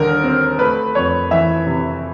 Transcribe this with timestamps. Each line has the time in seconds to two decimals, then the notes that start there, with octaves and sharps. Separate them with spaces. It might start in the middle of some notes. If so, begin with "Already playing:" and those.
Already playing: D#2 D3 G3 A#4
0.24 C4
0.59 A3 B4
0.95 F2 C#5
1.31 E3 E5
1.67 C3